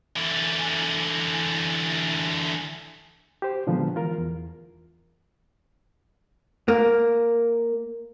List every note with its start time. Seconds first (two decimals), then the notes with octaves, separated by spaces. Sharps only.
0.16 D3 E3
3.42 G4 C5
3.67 A#2 D3 F3 F#3 G#3 B3
3.95 E3 F4 A#4
4.18 E2
6.68 A#3